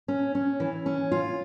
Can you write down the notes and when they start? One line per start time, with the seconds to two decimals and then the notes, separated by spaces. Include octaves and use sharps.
0.08 C#4
0.35 C#4
0.60 E3
0.86 C#4
1.12 F4